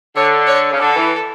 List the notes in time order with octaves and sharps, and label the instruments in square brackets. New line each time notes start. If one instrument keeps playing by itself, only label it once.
[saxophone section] D3 [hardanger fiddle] C#5
[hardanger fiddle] C#5
[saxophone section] C#3
[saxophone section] D3 [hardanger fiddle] A4
[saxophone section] E3